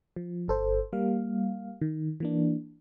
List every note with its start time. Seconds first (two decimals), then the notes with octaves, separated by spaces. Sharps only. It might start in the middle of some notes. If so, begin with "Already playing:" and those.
0.16 F3
0.48 G1 A4 C5
0.93 G3 A#3 F5
1.81 D#3
2.20 E3 A#3 D4